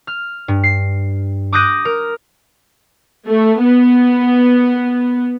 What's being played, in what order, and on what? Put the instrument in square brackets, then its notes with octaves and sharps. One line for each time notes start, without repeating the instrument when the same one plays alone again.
[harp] F6
G2
C7
D6 D#6 F#6 G6 A#6 D#7
A#4
[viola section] A3
B3